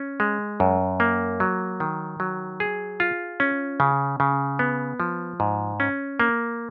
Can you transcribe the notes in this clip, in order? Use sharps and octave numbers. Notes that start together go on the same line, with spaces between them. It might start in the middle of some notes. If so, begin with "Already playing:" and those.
Already playing: C#4
G#3
F#2
A#3
F#3
D#3
F#3
G#4
F4
C#4
C#3
C#3
B3
F3
G#2
C#4
A#3